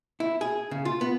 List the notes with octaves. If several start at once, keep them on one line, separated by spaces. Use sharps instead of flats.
E4
G#4
C#3
F4
B3